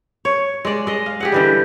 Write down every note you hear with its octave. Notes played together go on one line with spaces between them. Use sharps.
C#5
G#3 D5
G#3 D#5
F5
G4 G#4 F#5
D3 E3 G3